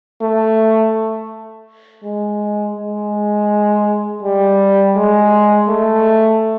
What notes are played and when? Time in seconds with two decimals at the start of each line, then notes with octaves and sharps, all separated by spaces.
0.22 A3
2.04 G#3
2.77 G#3
4.23 G3
4.96 G#3
5.68 A3